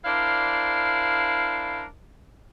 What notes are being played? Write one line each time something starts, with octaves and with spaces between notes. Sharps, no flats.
D4 E4 A#4 C5 D5 F5